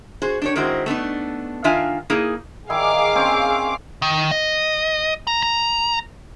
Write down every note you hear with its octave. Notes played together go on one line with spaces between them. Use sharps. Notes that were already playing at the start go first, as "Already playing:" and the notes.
F#4 G#4 C5
D4 G4 C#5
D#3 G#3 C4 E4 F#4 C5
A3 B3 D4 D#4
D#3 D4 F4 E5 F5 G#5
A#3 D#4 E4 G#4
D#3 E4 G#4 F5 D6
C4 C#4
D#3
D#5
A#5
A#5